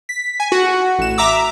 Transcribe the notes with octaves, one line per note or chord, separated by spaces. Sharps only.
B6
G#5
F#4
A1 E7
E5 A#5 D6 E6